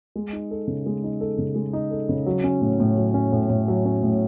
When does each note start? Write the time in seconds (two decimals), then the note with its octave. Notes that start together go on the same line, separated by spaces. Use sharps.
0.16 G#3
0.33 D#4
0.51 A4
0.67 C#3
0.86 G#3
1.03 D#4
1.21 A4
1.38 C#3
1.55 G#3
1.73 D#4
1.91 A4
2.09 C#3
2.26 F#3
2.44 C#4
2.61 A2
2.80 A2
2.97 F#3
3.14 C#4
3.32 A2
3.50 A2
3.68 F#3
3.85 C#4
4.03 A2